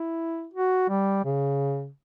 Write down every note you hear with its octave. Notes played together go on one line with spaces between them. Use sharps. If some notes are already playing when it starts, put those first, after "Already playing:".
Already playing: E4
F#4
G3
C#3